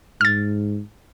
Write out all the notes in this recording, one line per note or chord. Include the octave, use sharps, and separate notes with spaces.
G#2 F6 A6